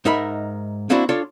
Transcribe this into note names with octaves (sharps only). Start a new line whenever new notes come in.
G#2 D#4 A#4 E5 B5
A#3 C4 D4 E4 F#4
D4 F4 A4 C#5